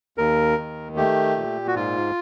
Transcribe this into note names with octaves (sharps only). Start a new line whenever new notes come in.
D#2 A#4
D#3
A3 G4
A#2
F#4
G#2 F4